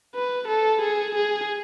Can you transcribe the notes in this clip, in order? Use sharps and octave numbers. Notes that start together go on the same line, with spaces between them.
B4
A4
G#4
G#4